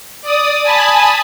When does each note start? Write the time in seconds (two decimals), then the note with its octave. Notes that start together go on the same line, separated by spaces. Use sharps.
0.22 D5 D#6
0.63 G#5 A5 B5 D#6